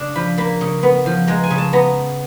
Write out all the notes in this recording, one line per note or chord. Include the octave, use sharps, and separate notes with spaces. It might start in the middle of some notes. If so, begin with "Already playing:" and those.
Already playing: C#3 D4
F3 B5
A#3 B5
C#3
B3
F3
G#3 A#5
G#5
C#3
A5
B3 A#5